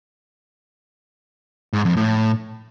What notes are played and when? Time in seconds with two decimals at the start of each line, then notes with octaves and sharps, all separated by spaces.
1.73 G#2
1.85 F2
1.97 A2